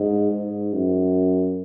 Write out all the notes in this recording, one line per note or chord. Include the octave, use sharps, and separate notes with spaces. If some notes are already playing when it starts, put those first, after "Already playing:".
Already playing: G#2
G#2
F#2